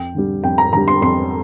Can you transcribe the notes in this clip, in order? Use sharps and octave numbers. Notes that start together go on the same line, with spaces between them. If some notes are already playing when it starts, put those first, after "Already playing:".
Already playing: F2 G5
D3 G3
F2 G5
A#5
D3 G3 A#5
C6
F2 C6